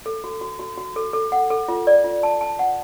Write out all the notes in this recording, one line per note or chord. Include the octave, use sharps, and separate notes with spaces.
A4
F#4
F#4
F#4
F#4
A4
A4
F#5
A4
F4
D5
F4
A5
A5
F#5